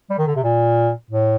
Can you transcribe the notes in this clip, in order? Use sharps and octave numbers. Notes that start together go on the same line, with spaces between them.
G3
D#3
D3
C3
A#2
A2